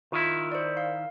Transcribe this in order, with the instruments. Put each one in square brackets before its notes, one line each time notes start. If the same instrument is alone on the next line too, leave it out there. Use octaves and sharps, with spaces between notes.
[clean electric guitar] D#3 E4 [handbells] F4
[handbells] C5 D5
F5